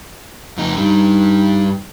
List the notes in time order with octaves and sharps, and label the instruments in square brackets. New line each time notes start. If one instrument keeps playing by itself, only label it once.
[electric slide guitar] F2 D#4
[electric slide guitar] G2 G3 [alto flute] D#4